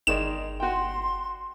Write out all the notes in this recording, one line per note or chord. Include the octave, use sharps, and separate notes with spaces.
G1 D#3 G#3 D5 E7
F#4 G5 C6